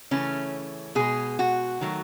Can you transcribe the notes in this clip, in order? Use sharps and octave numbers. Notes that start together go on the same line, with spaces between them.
C#3 E3 A3 C#4
B2 G#3 G#4
F#4
D#3 F#3 A3